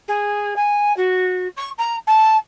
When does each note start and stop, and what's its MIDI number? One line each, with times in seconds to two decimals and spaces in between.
0.08 0.54 68
0.56 0.95 80
0.96 1.48 66
1.57 1.70 85
1.78 1.96 82
2.07 2.37 81